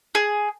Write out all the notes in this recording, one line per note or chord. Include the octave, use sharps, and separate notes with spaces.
G#4